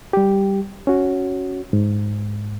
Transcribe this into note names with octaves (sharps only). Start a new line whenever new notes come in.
G3 G4
C#4 F#4
G#2